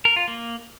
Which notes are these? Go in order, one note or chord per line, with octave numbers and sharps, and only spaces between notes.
A#4
F4
A#3